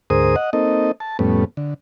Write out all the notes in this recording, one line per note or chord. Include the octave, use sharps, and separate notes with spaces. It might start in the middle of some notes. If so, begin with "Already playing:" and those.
D2 G#2 G#4 A#4 C5 D#6
D#5 F#5
A#3 C4 D#4 A4 D#5
A5
F2 A2 G3 A3 B3 C#4
D3